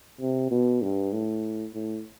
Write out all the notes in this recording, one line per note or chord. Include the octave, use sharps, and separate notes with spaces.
C3
B2
G2
A2
A2